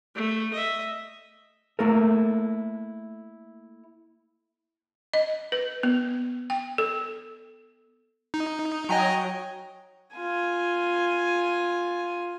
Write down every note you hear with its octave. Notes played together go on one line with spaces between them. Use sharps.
A3
D#5 E5
A3 A#3 E4 A4 A#4
D#5
B4
B3
G5
A4
D#4
F#3 D#5 G5 G#5 A#5
F4 G#5